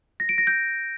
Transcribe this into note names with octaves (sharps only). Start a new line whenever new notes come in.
A#6
D7
A#6
G6